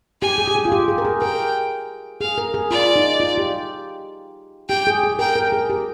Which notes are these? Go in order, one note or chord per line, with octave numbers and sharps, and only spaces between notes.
G4 G#5
G#4
G4
G#4
F4
G4
G#4
A#4
G#4
A#4 G5
G#4 F5
A#4
G#4
F4 D5
D#4
F4
G4
G4 G5
G#4
G#4
A#4 G5
A#4
G#4
G4